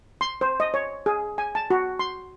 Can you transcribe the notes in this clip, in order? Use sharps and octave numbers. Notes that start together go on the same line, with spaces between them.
C6
C5
D#5
C#5
G#4
G#5
A5
F#4
C6